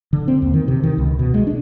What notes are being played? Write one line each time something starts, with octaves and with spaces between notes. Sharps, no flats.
D3
C4
D#2
D#3
C3
D#3
C#2
B2
G#3
D4